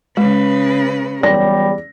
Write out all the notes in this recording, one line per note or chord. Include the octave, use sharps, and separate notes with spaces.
C#3 G#3 B4
E2 F#3 G3 D5 A#6